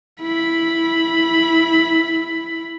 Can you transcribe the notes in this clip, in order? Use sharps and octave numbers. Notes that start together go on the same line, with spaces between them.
E4 B5